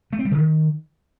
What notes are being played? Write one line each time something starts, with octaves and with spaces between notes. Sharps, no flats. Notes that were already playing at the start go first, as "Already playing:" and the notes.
A3
C4
G3
C#3
D#3